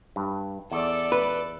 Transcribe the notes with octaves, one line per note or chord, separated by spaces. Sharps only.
G2
E2 A4 D5
B4